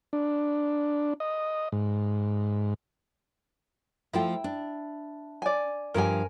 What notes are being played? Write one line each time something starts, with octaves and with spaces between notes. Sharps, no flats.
D4
D#5
G#2
F3 A3 E4 F4 G5
D4
D5 G#5
G2 F3 G4 A#4 G#5